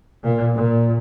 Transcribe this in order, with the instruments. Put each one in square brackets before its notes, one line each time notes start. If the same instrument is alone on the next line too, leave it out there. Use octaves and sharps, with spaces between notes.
[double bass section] A#2
A#2